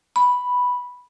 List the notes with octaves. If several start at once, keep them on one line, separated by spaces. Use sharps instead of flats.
B5